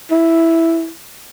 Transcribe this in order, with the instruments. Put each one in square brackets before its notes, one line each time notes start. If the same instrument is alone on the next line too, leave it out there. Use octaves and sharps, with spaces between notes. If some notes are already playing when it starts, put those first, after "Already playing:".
[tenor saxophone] E4